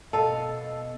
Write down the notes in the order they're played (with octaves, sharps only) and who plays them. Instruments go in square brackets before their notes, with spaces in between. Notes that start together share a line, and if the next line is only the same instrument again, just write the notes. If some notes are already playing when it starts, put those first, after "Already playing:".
[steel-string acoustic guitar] B2 F5 [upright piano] A4 [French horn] D#5 [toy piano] A5 B5